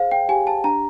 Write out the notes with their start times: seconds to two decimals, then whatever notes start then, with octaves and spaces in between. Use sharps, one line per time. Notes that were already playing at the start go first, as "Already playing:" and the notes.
Already playing: G#4 C5 F5
0.11 G5
0.29 G4 G#5
0.47 A5
0.64 D4 A#5